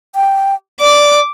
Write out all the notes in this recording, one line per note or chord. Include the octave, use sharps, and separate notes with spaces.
G5
D5 D6